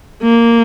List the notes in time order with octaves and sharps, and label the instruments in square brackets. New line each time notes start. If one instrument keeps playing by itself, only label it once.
[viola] A#3